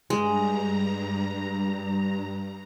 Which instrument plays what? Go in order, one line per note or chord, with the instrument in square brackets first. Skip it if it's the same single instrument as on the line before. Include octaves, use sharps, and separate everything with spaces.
[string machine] G2 A#5 [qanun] G#3